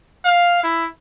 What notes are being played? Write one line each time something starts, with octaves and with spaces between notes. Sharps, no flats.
F5
E4